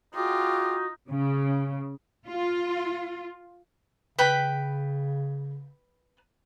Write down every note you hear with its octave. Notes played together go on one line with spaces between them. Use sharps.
D#4 F4 F#4 G#4 G5 D6
C#3
F4
C#3 B4 G5 B5